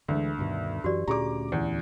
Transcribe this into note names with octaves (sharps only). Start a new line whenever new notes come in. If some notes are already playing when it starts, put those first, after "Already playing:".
D2 D3 E3 G#3
G2 B2 D#3
F#2 E3 F#4 G4 D5
D2 A#2 C#4 G4 G#4 D5 A#5 D6
E2